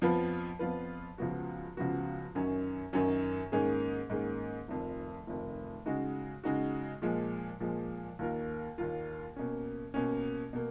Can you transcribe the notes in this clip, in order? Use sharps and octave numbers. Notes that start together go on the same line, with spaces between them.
F2 F3 B3 F4 B4
F2 F3 B3 F4 B4
C#2 C#3 F3 B3 F#4
C#2 C#3 F3 B3 F#4
F#2 D#3 F#3 C#4
F#2 D#3 F#3 C#4
G#2 D#3 A#3 C#4 G#4
G#2 D#3 A#3 C#4 G#4
F1 F2 D#3
F1 F2 D#3
C#3 G#3 D#4 F#4
C#3 G#3 D#4 F#4
A#2 F3 G#3
A#2 F3 G#3
D#2 D#3 A#3 F4 A#4
D#2 D#3 A#3 F4 A#4
B2 A#3 C#4
B2 A#3 C#4
B2 A#3